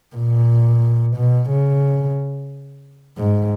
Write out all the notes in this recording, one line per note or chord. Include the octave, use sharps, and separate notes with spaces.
A#2
B2
C#3
G#2